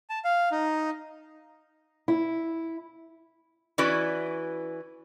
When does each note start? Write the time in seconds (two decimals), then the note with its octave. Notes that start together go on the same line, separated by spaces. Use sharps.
0.10 A5
0.25 F5
0.52 D#4
2.08 E4
3.78 E3 C#4 E4 F#4 B4 D5